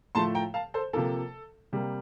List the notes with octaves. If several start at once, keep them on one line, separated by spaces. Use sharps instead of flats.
A2 F3 A3 A5 C6
G5 A#5
F5 A5
A4 C5
C3 F3 A#3 A4
C3 G3 A#3